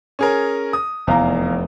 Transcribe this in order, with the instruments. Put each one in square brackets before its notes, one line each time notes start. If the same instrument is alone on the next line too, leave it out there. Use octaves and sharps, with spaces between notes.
[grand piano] C#4 G#4 A#4
D#6
[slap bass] F1 [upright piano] E2 F5 A#5